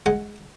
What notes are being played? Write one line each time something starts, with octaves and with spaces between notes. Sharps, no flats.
G#3 F#5